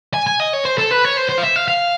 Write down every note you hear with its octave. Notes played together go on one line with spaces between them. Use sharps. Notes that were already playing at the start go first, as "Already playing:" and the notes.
G#5
G#5
D#5
C#5
C5
A4
B4
C#5
C5
C5
F5
E5
F5
F5